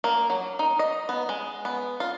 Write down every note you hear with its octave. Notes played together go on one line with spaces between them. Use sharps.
A#3
F#3
D#4
D#5
B3
G#3
B3
F4